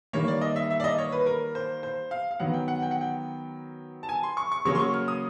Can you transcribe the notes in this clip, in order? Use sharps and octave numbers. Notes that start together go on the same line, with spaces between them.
D#3 G3 A#3 C#5
D5
D#5
E5
E5
D5
D#5
C#5
B4
A#4
C5
C5
F5
F5
D#3 F#3 B3 F#5
G5
F#5
G5
F#5
G5
A5
G#5
C6
C#6
C#6
C#3 F#3 A#3 C#4 C#6
C6
C#6
F6
D#6